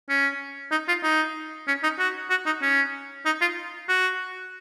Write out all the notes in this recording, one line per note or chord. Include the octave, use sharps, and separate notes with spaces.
C#4
D#4
F4
D#4
C#4
D#4
F#4
F#4
D#4
C#4
D#4
F4
F#4